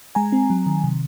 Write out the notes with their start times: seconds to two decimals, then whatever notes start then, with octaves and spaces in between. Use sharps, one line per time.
0.15 G#3 G#5 A#5
0.32 C4
0.50 F#3
0.66 D#3
0.84 C3